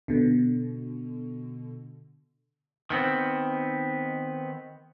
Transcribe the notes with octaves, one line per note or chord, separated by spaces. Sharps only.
B2 D3
D#3 B3 C4